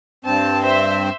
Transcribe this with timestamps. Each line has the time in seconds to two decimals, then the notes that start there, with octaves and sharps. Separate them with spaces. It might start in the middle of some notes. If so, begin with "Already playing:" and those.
0.25 G2 C4 A5
0.63 C5 E5